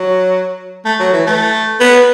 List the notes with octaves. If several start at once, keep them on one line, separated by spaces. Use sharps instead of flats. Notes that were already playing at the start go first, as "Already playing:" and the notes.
Already playing: F#3
A3
F#3
E3
A3
B3